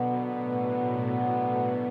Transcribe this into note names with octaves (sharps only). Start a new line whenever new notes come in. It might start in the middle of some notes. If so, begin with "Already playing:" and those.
Already playing: B2 D3 F#3 B3
A2